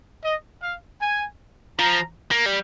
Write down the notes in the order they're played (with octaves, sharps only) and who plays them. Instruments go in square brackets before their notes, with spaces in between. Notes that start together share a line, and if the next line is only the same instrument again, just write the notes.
[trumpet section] D#5
F5
G#5
[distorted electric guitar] F3 [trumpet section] A#5
[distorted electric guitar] A#3
G3